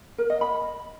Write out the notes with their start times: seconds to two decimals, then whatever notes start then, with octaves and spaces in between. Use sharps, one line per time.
0.18 A#4
0.30 D#5
0.41 B5